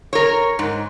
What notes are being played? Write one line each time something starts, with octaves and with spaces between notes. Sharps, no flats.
A#4 C#5
G#2